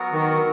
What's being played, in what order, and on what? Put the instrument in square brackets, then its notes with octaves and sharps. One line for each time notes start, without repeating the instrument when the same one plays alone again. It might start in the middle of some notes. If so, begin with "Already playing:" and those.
Already playing: [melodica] F#3 B3 F#4 A#4
[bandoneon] D#3